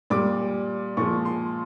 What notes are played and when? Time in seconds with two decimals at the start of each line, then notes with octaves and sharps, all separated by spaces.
0.10 A#2 G3 D6
0.97 A#2 F3 G#3 C#6
1.25 C6